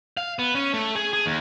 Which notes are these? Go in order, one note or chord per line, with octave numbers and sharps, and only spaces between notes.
F5
B3
C#4
A3
G#4
G#4
D#2